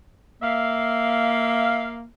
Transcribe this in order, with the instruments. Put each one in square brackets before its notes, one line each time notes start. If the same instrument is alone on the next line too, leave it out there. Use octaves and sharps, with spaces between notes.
[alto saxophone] A#3 [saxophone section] E5 F5